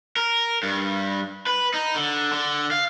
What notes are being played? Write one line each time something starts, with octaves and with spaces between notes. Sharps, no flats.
A#4
G2
B4
D#4
D3
D3
F5